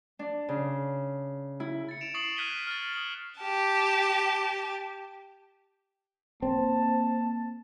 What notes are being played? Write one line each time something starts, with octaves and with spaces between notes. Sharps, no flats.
D4
C#3
E4
A6 C#7
D7 E7 F7
C#6 D#6 A6 C7 C#7 F#7
F6 F#6 G#6 B6 D#7 G7
F6 A6
D#6 F#7
G4 A5
A#3 C4 A5